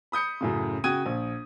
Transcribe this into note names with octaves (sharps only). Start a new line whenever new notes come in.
B5 D#6 G6 C#7
F#2 A2 C#3
C#3 F#4 G5 D#6 G#6 D#7
A#1